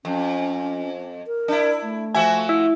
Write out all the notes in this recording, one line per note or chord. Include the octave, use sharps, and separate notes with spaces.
F2 C#4
A#4
D4 E4
A3
F3 F#4 E5 G#5
E4